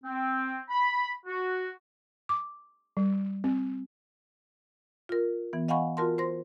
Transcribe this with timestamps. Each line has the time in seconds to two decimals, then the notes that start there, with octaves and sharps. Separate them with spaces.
0.04 C4
0.70 B5
1.26 F#4
2.29 D6
2.97 G3
3.44 C4
5.09 F4 A#4
5.53 E3 B3
5.68 D#5 F5 F#5 G#5 B5 C#6
5.97 F4 F#4 A#4 A5 C6
6.18 C5 C6 A#6